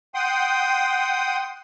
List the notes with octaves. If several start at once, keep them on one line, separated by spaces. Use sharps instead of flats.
F#5 G5 C6 D#6